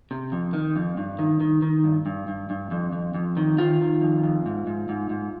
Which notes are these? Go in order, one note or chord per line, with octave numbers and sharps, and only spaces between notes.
C3
F2
D#3
F2
G2
D#3
D#3
D#3
G2
G2
G2
G2
F2
F2
F2
D#3
D#3 F4
D#3
F2
F2
G#2
G#2
G#2
G#2